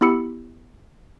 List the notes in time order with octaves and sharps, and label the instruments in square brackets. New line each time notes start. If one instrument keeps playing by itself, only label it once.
[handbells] B3 E4 G4 B5 E6 C#7